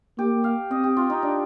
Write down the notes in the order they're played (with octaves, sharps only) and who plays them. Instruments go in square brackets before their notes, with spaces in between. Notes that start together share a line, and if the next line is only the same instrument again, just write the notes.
[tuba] A#3 [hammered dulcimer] G4
[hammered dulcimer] F5
[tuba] C4 [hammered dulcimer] D#5
[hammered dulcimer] G4
F4
D#4
D4